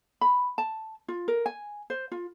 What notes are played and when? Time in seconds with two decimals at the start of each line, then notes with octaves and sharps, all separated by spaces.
0.21 B5
0.58 A5
1.08 F4
1.28 A#4
1.46 G#5
1.90 C5
2.12 F4